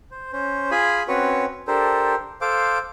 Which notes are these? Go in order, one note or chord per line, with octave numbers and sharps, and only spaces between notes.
C5
C#4 C5
F4 G#4 G#5 B5
C4 C#4 F#4 B4 C#5
D4 G4 A4 A#4 C5
A4 C5 F5 D6